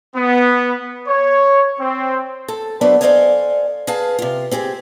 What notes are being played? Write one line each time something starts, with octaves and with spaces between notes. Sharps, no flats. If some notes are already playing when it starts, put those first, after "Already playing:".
B3
C#5
C4
A4
F#3 B3 D4 A4 C5 E5
A4 C5 D5 D#5 F5 G#5
G#4 B4 F5 A5
C3 F4
C4 G4 G#4 C5